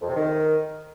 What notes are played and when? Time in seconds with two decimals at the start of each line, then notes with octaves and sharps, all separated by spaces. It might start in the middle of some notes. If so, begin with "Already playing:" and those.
0.01 F2
0.08 C3
0.15 D#3